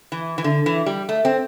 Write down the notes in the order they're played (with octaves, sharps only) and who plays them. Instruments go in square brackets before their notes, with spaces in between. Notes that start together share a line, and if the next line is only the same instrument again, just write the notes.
[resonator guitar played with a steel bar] E3
E3
D3
E3
G3
A3
C4